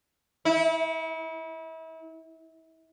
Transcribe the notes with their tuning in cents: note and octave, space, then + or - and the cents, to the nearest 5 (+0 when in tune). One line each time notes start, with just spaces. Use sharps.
E4 -35